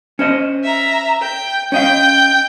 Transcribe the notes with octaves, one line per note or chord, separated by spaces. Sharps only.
C#4 C5 D#5
E5 A#5
G5
C#4 D#5 F5 G5